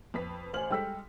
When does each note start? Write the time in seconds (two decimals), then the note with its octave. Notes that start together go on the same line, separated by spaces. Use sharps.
0.14 F2 B4 B6
0.53 A1 C5 G#5 F6 F#7
0.71 G3 G#3 A4 G5 E6 B6